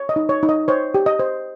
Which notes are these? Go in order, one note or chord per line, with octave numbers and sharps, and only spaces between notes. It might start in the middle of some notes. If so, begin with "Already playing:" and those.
Already playing: C#5
D#5
D#4
C#5
D#4
D#5
C5 C#5
G4
D#5
C5